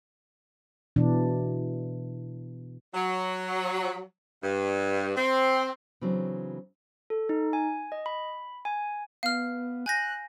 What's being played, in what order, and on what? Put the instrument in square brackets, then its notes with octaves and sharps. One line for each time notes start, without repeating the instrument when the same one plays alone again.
[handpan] B2 E3 D4
[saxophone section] F#3
G2
C4
[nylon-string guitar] C#3 E3 F#3 C4 D4
[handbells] A4
D#4
G#5
D#5
B5
G#5
[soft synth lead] B3 [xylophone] F5 F6
[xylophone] G#5 G6 A#6 [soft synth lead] F#6